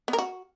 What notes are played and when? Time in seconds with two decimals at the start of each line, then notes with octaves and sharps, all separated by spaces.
0.08 B3
0.13 A#4
0.18 F#4